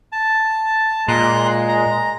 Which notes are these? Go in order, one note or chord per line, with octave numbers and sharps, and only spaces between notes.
A5
A#2 G#3 A#5 C6 F#6
A#5